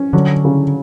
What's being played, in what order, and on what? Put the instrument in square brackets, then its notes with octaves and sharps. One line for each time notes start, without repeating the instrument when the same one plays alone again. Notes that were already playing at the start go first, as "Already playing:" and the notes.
Already playing: [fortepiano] C#4
[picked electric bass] D3 [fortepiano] F#3
[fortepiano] C#3